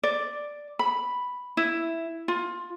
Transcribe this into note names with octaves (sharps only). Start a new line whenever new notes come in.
D5
B5
E4
F4